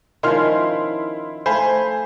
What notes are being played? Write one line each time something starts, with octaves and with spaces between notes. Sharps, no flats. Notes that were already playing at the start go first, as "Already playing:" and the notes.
D#3 F3 C#4 E4 C6 F6
A3 C5 F5 G#5 B5